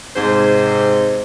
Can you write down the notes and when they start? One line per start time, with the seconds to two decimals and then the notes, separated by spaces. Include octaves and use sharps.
0.16 G#2 C3 D#4 C5